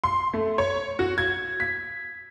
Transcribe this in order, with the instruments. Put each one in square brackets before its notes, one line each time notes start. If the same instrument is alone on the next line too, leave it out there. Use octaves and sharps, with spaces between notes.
[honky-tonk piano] C6
A3
C#5
F#4
G#6
B6